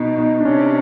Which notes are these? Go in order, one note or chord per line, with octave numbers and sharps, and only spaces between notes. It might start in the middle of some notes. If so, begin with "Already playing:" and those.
Already playing: B2 D#4
D#4
D4
C3 C#4